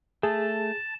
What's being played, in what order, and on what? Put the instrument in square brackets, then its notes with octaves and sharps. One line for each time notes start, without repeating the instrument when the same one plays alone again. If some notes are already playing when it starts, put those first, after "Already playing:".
[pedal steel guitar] A3 [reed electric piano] G#4 [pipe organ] A5